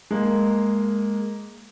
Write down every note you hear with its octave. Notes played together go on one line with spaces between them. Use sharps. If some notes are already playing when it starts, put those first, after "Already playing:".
G#3 A#3